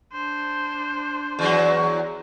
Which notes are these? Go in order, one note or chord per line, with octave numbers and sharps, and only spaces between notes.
D4 C5
E2 F#3